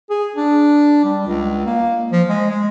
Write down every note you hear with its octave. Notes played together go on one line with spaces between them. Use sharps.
G#4
D4
G3
C#2
A#3
F3
G#3
G#3